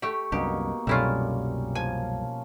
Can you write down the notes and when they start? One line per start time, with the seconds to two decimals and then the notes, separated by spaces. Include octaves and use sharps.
0.02 A3 G4 C#6
0.32 C2 F#2 B2 A#3 D4 D#4 G4
0.87 C2 F#2 B2 G3 A3 C#4 E4 F4
1.75 F3 G#5